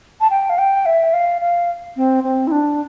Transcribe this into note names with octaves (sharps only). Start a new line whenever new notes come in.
A5
G5
F5
G5
E5
F5
F5
C4
C4
E4
D4